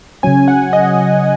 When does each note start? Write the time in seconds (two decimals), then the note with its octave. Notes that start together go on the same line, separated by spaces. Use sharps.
0.23 C#3 F#3 C#4 G#5
0.48 F#5
0.73 D#5